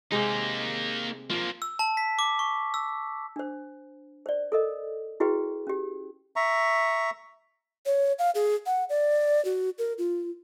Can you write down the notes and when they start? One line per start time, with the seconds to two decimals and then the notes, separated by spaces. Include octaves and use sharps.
0.12 C3 G#3 A#3 D#4
1.30 F3 A#3 F4 A#4
1.62 E6
1.79 A5
1.97 B6
2.19 D6
2.39 C#6
2.74 E6
3.36 D4 C5
4.26 C5 D5
4.52 A4 A#4 D#5
5.20 E4 F#4 G#4 B4 G5
5.67 C#4 G4
6.36 E5 A#5 C#6
7.86 C#5
8.19 F5
8.35 G#4
8.66 F#5
8.89 D5
9.45 F#4
9.78 A#4
9.98 F4